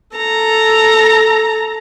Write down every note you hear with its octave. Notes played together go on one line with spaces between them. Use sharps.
A4 A#5